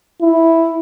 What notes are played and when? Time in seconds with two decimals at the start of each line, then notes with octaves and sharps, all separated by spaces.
0.22 E4